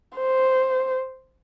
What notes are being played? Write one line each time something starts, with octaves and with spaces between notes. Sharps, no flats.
C5